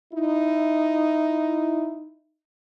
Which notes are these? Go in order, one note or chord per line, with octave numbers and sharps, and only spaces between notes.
D#4 E4